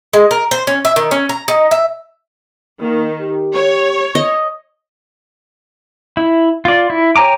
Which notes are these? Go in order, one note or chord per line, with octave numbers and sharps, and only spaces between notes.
G#3
A#4
C5
C#4
E5
D#3
C#4
A#5
D#4
E5
D#3 A#3
G4
C#5
D#5
E4
F4 D5
E4
G4 C#5 G#5 A#5 D6